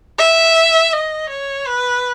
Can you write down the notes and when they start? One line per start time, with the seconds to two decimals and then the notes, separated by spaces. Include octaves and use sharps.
0.19 E5
0.93 D#5
1.30 C#5
1.67 B4